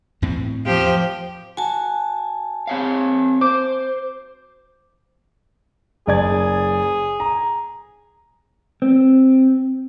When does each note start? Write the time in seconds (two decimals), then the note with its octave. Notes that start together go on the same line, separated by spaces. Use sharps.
0.22 E2 A2 C4
0.66 F3 G4 C5
1.57 F#4 G#5 A5
2.67 C4 C#5 F5
3.41 C5 D6
6.07 F#1 G#4 D5 G#6
7.20 A#5
8.82 C4